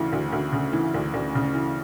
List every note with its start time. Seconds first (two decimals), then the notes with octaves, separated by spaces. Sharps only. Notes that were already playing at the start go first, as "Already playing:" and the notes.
Already playing: D2 C#3 E3
0.12 D2
0.32 D2
0.53 C#3
0.73 E3
0.94 D2
1.14 D2
1.35 C#3
1.55 E3